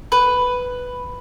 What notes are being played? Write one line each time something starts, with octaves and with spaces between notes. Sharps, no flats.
B4